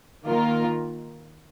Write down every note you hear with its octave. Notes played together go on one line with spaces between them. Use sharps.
D#3 A#3 F4 A#4